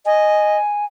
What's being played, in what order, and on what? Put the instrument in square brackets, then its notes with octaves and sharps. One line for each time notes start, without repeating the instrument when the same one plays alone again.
[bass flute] D#5 [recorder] G#5